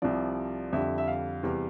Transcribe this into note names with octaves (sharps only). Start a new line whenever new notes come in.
C2 C3 F3 D5
F2 D3 G3 E5
E5
F5
E2 C3 G3